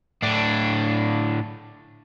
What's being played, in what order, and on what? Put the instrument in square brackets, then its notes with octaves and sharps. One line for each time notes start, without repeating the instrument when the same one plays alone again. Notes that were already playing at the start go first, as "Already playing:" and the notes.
[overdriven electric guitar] A2 D4